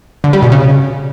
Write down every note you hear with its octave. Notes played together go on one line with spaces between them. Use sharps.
D3
G3
B2
C#3